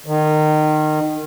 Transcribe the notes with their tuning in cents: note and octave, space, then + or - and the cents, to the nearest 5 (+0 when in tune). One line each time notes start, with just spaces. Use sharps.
D#3 -25